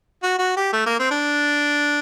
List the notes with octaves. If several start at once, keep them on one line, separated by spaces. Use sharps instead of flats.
F#4
F#4
G4
A3
A#3
C4
D4